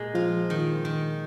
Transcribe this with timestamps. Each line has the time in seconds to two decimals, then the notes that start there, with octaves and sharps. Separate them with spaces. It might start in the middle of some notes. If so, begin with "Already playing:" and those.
Already playing: A#2 G#3
0.14 F3 F4
0.50 D#3
0.85 D#3